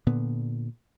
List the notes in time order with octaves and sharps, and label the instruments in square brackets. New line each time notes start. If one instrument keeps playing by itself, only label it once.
[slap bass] A#2 D3 B3